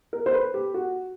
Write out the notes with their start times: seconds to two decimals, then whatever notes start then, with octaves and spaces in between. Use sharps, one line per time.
0.13 A#4
0.26 C5
0.34 B4
0.54 G4
0.74 F#4